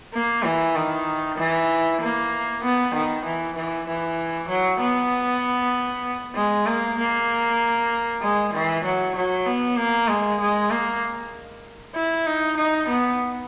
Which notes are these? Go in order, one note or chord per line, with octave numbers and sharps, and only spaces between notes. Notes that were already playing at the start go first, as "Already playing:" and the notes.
A#3
E3
D#3
E3
A#3
B3
D#3
E3
E3
E3
F#3
B3
G#3
A#3
A#3
G#3
E3
F#3
F#3
B3
A#3
G#3
G#3
A#3
E4
D#4
D#4
B3